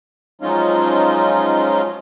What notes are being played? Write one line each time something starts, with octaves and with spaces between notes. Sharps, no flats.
F3 F#3 G#3 C#4 D#4 F4